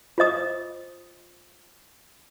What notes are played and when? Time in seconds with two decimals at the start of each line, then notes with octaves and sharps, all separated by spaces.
0.18 F4 C5 D#5 D#6